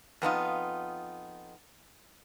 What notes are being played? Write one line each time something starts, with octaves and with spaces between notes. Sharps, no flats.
F2 B3 D#4 F4